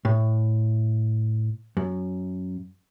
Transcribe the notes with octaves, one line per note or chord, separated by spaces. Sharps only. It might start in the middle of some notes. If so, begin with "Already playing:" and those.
A2
F#2